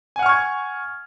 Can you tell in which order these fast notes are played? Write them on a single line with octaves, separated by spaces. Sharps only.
G#5 F#5 F6 C#6 G#6